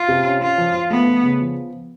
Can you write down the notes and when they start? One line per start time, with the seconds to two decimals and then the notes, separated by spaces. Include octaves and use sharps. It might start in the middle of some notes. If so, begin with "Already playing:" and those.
Already playing: F4
0.08 C3
0.25 C#4
0.42 C#4 F4
0.58 F3
0.75 F3
0.91 A3 B3
1.07 A3
1.23 C#3
1.41 F3